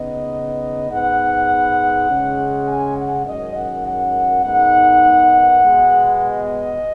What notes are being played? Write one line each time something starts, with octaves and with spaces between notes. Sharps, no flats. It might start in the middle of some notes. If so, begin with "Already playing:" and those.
Already playing: C#3 B3 D#4 D#5
G#2 G#3 B3 F#5
C#3 G#3 C#4
G#5
F#5
F#2 D#3 G#3 C#4 D#5
F#5
F#5
G#2 D#3 G#3 B3 D#4 F#5
B2 G#3 B3
D#5